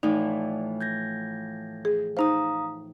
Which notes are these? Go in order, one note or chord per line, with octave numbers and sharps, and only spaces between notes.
A2 E3 F3 D#4 D5
G6 G#6 A#6
G#4
D#4 C5 F5 A#5 D#6